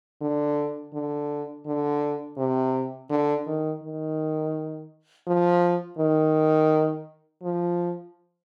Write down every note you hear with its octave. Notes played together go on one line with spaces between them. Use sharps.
D3
D3
D3
C3
D3
D#3
D#3
F3
D#3
F3